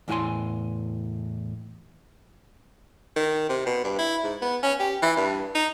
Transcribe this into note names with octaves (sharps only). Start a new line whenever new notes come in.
E2 A2 E4 F#5 G#5 C6
D#3
C3
B2
G2
E4
G#2
B3
C#4
G4
E3
G2
D#4